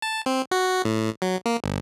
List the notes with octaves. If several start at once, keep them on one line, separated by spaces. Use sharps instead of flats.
A5
C4
F#4
A2
F#3
A#3
G1